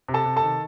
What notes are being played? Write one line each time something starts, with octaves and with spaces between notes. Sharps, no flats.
C3
A4 A5
C3
A4 A5
D#3